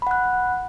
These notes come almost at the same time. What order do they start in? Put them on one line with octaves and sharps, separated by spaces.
B5 F#5 F#6